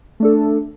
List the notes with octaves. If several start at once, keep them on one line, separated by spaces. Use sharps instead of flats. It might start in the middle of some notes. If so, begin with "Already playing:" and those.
A3 D4 A4